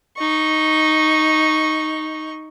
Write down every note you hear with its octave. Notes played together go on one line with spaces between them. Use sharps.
D#4 C#6